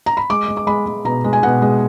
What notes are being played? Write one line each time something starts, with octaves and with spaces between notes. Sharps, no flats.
A#5
B5
G#3 D6
G#3
D6
G#3 B5
G#3
B2 A#5
G#3
G#5
B2 F#5
G#3